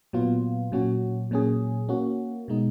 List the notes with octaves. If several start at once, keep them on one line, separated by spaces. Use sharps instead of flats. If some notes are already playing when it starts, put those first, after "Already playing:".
A#2 F#3 B3 F4
A#2 F#3 C#4 F#4
A#2 F#3 C#4 G#4
A#3 C#4 F#4
B2 G#3 D#4